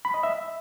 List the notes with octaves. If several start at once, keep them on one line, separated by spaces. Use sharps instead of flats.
B5
D#5
E5